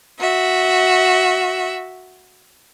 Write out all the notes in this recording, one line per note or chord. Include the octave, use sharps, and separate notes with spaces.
F#4 E5